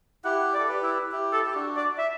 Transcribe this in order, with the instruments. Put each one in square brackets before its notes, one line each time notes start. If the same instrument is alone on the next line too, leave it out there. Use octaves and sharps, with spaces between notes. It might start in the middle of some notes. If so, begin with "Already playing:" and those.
[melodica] E4 G4 [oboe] F#5
[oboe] D5
[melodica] A4
G4 B4
[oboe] E4
[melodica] E4 G4
[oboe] A4
[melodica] G4
D4 F#4
[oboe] D5
E5